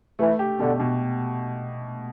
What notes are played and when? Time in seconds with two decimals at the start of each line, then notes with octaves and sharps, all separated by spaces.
0.19 E3 A3
0.39 G4
0.59 B2 D3
0.80 B2